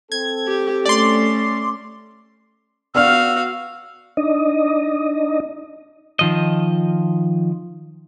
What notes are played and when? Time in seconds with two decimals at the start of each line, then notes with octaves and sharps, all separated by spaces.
0.12 C4 A4 G#6
0.47 G4
0.85 A3 C#4 D5 C6
2.95 B3 F#4 D5 F5 E6 F6
4.17 D4 D#4 D#5
6.19 D#3 F3 D#5